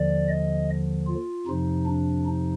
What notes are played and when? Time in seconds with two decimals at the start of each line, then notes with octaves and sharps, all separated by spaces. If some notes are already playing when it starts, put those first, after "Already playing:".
Already playing: D#2 D3 F3 D5
0.29 D#5
1.07 F4
1.47 F2 C3 F3 D#4
1.86 D4
2.26 D#4